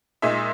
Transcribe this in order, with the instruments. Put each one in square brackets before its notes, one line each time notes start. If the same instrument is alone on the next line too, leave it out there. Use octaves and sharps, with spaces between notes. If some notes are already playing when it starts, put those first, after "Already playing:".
[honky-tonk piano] A#2 G#3 D#4 E5